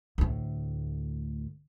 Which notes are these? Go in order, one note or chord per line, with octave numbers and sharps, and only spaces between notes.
D2 A2